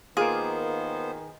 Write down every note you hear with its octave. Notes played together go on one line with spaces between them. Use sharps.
D#3 A#3 B3 F4 G#4 C5